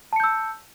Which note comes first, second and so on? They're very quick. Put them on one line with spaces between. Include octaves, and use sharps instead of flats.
A5 C#7 G6 E6